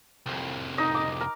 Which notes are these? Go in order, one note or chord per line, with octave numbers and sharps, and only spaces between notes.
C2 F2
D#4 D#5
D6
A#4